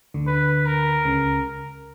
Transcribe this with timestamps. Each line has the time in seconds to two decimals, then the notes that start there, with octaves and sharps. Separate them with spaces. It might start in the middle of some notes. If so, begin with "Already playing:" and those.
0.14 D2 D3
0.27 B4
0.66 A#4
1.05 C#2 C#3